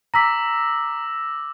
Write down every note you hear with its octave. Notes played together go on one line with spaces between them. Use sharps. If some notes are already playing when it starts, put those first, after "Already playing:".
A#5 D6 E6 A#6 B6